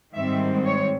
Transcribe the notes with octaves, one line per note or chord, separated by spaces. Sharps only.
G#2 D#3 G3 C4 E5
C#5